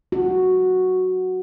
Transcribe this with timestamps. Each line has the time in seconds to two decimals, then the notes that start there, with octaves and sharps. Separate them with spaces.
0.12 F#4